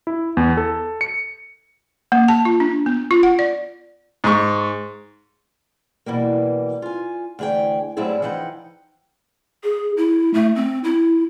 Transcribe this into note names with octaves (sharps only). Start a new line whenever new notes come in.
E4
E2
A4
C#7
A#3
A5
F4
D4
B3
F4
F#5
D5
G#2 C#6
B2 E3 G3 A#3
F4 G#5
D2 E3 G#4 A4 G5
A2 F#3 G3 C4 E4 G#4
E3 F3 D#4 F#5 G5
G#4
E4
A3
C4
E4